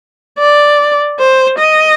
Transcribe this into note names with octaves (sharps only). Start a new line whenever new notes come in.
D5
C5
D#5